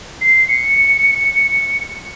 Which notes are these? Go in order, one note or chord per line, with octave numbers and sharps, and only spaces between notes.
C7
C#7